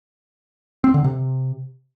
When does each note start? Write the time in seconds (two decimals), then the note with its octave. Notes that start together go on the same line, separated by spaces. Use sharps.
0.84 C4
0.94 D3
1.04 C3